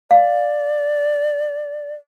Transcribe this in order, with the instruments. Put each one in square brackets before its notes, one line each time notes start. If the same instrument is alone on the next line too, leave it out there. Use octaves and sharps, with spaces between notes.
[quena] D5 [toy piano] F5